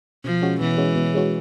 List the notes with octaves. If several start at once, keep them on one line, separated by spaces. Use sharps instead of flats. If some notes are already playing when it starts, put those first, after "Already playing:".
B2 F3
G#3 C#4 F#4
B2 E3
G#3 C#4 F#4
B2
G#3 C#4 F#4